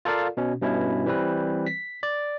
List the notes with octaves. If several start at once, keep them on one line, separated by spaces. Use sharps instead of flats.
F4 A4 A#4 D5 F5
B2 C#4
G2 B2 C#4 E4
E3 G3 C4 B4
B6
D5